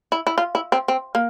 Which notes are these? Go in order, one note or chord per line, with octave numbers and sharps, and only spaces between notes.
E4
E4
F4
E4
C4
C4
A#3